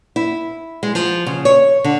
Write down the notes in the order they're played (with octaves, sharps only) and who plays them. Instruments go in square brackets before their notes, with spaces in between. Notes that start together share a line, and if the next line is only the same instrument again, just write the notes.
[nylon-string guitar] E4
G#3
F3
C#3
C#5
D3